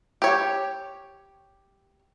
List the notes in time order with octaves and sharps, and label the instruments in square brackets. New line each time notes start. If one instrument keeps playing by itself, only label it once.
[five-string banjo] G4 C#5